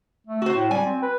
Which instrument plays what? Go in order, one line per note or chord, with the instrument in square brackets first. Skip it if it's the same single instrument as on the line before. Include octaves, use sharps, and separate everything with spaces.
[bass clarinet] A3
[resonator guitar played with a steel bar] F#4 C5
[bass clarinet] A2
[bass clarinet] G3 [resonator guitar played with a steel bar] G#5
[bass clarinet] C4
B4